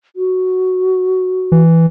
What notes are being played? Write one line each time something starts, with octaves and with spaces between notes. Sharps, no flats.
F#4
E3